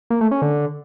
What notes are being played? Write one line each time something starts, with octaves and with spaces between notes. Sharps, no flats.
A#3
A3
C#4
D3